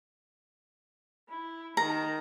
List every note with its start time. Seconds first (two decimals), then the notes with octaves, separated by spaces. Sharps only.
1.29 E4
1.77 D#3 A#5